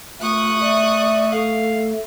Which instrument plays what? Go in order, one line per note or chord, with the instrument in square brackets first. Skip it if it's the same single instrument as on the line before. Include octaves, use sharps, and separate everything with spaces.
[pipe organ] A3 [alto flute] F4 [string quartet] C#6 D#6 F#6
[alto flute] D5 [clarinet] E5
[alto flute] A4 [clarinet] F5